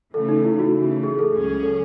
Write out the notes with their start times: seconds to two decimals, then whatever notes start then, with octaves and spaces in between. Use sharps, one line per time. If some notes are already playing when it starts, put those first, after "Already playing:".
0.14 C#3 E3 A3 A4
0.29 D#4
0.44 E4
0.59 F#4
0.74 C#3 E3 A3
1.04 G#4
1.19 A4
1.34 C#2 C#3 F#3 C#4 G#4
1.63 A4